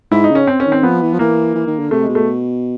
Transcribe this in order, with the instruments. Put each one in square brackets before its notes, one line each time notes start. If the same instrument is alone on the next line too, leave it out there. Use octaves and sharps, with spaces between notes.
[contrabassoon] G#2 [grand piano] E4
[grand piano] D#4
[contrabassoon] C#3
[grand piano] C#4
C4
C#4
[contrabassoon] D#3
[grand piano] C4
[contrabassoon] F3 [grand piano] B3
[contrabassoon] E3
F3
[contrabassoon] E3 [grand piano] A#3
[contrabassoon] E3
D#3
D3
[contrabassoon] C3 [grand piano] A3
[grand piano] G#3
[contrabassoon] B2
[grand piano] A3